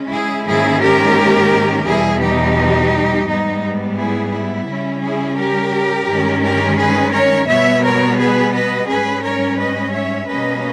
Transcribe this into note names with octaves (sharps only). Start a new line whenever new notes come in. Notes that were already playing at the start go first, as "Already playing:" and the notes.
Already playing: C#3 G#3 C#4
E4 G#4
G#2 D#3 A#3 C#4 E4 G#4
G4 A#4
E2 B2 G3 E4 G#4
D#4 G4
G#2 G3 B3 D#4
E4 G#4
E4
C#3 G3 C#4
E4 G#4
G4 A#4
G2 D#3 G#3 C#4
G4 A#4
G#4 B4
A#4 C#5
B2 G3 B3 C#5 E5
A#4 C#5
G#4 B4
B4 D#5
G#2 G3 C#4 G#4 B4
A#4 C#5
B4 D#5
C#5 E5
B2 G3 A#3 C#4 B4 D#5